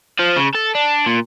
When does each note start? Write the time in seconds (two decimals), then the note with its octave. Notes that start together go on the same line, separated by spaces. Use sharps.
0.19 F3
0.36 C#3
0.55 A4
0.75 D4
1.06 A#2